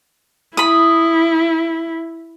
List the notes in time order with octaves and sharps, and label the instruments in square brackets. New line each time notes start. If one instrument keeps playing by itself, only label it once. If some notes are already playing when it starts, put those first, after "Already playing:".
[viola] E4 [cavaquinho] B5 D#6